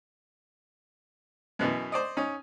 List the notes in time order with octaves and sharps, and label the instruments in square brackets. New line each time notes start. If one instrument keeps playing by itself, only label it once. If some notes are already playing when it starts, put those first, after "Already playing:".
[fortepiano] F#2 B2 E3
C5 D5 D#5
C#4 D#4